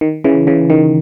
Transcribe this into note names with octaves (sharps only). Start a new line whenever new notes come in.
D#3
C#3 E3
C#3 E3
D#3